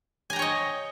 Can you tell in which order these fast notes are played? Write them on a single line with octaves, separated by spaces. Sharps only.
G#5 A#5 G5 C#5 D#5